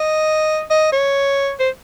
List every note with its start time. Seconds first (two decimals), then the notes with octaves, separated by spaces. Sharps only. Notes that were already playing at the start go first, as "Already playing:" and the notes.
Already playing: D#5
0.71 D#5
0.93 C#5
1.60 C5